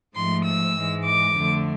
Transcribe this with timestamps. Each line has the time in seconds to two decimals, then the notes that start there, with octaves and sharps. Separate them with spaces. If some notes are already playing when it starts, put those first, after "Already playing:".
0.16 G#2 F3 A3 C6
0.46 E6
0.76 G#2 E3 G#3
1.06 D6
1.36 F2 D3 A3